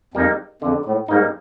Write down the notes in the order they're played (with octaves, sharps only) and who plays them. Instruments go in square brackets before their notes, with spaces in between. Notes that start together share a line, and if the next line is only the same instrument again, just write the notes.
[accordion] F2 [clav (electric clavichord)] G3 A#3 D#4
[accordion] F2 [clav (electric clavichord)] D3
[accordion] A2
[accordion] G#2 [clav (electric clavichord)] G3 A#3 D#4